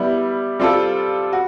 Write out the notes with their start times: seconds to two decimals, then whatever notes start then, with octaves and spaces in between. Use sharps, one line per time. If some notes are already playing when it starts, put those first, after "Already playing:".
Already playing: G3 B3 E4
0.59 G3 C4 F4 A4
1.33 F#4